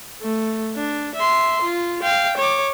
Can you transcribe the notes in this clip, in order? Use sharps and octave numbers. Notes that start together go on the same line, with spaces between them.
A3
D4
E5 C6
F4
F5 G5
C#5 D6